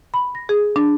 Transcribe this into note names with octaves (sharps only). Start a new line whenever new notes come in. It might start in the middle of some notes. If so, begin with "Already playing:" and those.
B5
A#6
G#4
D4